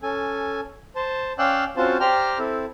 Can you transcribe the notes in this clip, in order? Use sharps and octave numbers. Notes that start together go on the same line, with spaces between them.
C#4 A4 G#5
C5 A5
C#4 D5 F5 G5 E6 F#6
C4 C#4 F4 F#4 C5 A5
G4 C5 D5 G5 A#5 F6
C4 E4 A4